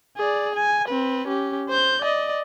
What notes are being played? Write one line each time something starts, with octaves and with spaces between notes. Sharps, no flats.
G#4 D5
G#5
C4 B4
C#4 G4
C5 G6
D5 D#5